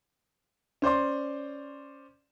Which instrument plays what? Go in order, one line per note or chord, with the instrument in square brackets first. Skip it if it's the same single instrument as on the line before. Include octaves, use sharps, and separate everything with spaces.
[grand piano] C#4 C5 D5 C6